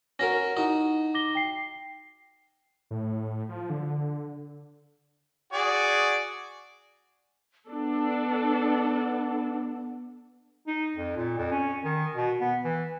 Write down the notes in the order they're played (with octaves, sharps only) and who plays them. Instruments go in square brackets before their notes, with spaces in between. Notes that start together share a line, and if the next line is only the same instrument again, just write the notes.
[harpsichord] C#4 F#4 A#4 [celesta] A#6
[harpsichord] D#4 F#4 [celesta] E4
[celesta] D6 A#6 G7
G5 C7
[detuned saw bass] A2
F3
D3
[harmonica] F#4 G#4 D5
[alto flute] B3 [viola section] D4 A4
[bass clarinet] D#4
F2
A#2
F2
C#4
D#3
B2
B3
E3